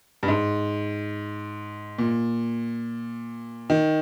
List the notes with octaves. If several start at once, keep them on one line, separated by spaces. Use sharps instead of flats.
G2
G#2
A#2
D#3